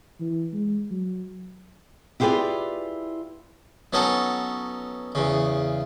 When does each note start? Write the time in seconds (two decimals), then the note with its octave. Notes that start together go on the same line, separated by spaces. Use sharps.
0.20 E3
0.53 G#3
0.91 F#3
2.20 E4 F4 G4 G#4 B4 D5
3.93 F#3 B3 C#4 D#4 A4
5.15 E2 C#3